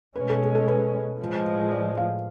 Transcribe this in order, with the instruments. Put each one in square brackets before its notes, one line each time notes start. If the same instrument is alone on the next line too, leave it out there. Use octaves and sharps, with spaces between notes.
[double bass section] B2 G#3 C#4 [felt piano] B4
[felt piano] A4
G#4
A4
B4
[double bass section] A2 F3 G#3
[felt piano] D5
F5